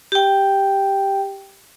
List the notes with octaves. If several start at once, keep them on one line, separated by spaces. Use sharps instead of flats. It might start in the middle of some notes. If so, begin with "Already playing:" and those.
G4 G5